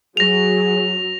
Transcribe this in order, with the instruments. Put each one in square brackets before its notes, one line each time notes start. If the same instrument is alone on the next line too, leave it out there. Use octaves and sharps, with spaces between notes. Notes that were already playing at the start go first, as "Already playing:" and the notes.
[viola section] F#3 [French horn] G#4 [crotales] A#6 F7